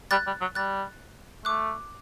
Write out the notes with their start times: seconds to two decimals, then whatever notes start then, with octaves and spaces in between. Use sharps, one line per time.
0.11 G3 F#6 A6
0.27 G3
0.41 F#3
0.55 G3 F#6 A6
1.45 A3 D6 F#6